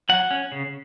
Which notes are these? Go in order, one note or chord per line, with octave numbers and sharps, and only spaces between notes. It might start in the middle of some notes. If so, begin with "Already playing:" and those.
F#3 F#5
C#4
C#3